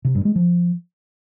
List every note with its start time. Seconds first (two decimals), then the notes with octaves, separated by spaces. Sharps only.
0.05 C3
0.15 G2
0.25 G#3
0.36 F3